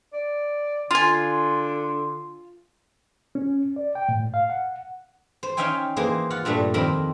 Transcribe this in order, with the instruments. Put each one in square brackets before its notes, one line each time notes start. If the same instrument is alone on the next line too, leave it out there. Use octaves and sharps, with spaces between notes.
[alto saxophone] D5
[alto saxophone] D3 [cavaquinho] F4 G#5 [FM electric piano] C6
[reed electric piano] C#4
D5
G5
A2
F5
F#5
[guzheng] C5
C#4 D#4 E5 F5 G5 G#5
E3 A#3 G#4 C5
F4 F#5
G2 A#2 G3 A3
F2 D#3 A#3 C4 A#4 B5